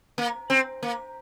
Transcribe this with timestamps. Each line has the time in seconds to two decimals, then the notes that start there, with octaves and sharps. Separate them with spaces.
0.18 A#3
0.50 C4
0.83 A#3